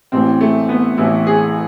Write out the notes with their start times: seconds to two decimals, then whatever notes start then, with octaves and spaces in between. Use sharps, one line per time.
0.12 A1 A2 E3 C4
0.41 A3
0.69 B3
0.97 A1 A2 E3 E4
1.27 G#4